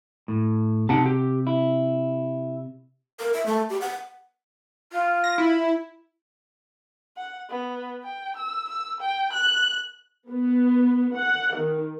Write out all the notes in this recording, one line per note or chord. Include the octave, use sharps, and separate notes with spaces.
A2
C3 D#4 F#5 A5
G4
E4
A#4
E5
A3
G4
F#5
F4
A#6
E4
F#5
B3
G5
E6
E6
G5
F#6
B3
F#5
D#3